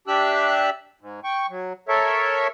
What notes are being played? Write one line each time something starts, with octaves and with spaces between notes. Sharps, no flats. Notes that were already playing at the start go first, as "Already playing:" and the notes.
D4 G4 E5 E6 F#6
G#2
G5 C#6
F#3
A4 A#4 C#5 E5